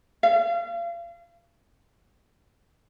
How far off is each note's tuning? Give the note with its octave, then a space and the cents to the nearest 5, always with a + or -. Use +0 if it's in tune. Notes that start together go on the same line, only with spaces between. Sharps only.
F5 -35